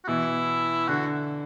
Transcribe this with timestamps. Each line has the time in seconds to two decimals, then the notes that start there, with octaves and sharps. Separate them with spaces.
0.04 F#4
0.08 B2 E3 E4
0.88 D3 F#4